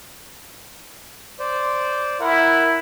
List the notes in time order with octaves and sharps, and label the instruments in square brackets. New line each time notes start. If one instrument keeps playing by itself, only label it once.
[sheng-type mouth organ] C5 D5
[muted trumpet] E4 [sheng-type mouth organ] A#4 F#5